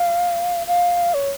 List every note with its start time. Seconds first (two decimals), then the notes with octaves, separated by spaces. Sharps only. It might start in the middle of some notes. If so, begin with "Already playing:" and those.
Already playing: F5
0.67 F5
1.14 C#5